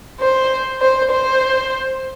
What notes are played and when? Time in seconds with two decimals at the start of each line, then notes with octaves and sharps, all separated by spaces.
0.20 C5
0.81 C5
1.11 C5